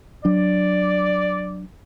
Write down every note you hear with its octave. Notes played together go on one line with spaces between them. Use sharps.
F#3 D4 D5